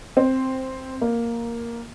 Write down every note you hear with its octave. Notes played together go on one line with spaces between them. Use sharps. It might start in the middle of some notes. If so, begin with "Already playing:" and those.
C4
A#3